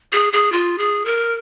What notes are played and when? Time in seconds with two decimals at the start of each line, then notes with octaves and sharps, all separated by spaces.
0.12 G#4
0.33 G#4
0.52 F4
0.78 G#4
1.05 A#4